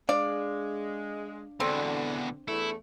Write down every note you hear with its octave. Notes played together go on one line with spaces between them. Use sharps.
G#3 D4 D5 F5
E2 B2 D3 C4
E2 A3 E4